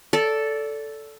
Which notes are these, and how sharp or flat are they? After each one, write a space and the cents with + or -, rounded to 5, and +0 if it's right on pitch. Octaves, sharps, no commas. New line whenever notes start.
A4 +0 D5 -25